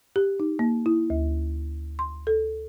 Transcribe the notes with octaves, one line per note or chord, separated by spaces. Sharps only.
G4
D#4
A#3
E4
D2
C6
A4